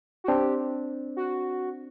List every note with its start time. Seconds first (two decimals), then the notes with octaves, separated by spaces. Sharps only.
0.24 F#4
0.28 C4 D4 G4
1.16 F#4